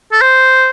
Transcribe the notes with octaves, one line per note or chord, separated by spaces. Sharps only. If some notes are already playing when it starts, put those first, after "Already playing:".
A4
C5